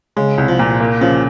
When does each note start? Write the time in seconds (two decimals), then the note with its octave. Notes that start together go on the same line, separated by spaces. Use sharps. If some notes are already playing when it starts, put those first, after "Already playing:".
0.17 C#3 G#3
0.38 C2
0.48 F3
0.59 A#2
0.81 A#3
1.01 C#3 F3